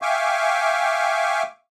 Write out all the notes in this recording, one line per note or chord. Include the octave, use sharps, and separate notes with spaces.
E5 F5 G5 G#5 C#6 D6